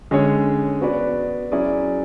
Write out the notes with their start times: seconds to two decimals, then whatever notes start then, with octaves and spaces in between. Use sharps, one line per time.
0.11 D3 G#3 C#4 G#4 C#5
0.81 B3 F#4 B4 D5
1.52 F#3 C#4 E4 G#4 D5